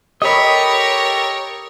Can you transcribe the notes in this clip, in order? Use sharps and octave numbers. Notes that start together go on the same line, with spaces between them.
G4 A4 A#4 C#5 D#5 B5